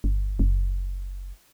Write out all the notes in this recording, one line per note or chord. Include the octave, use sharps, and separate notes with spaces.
G1
F#1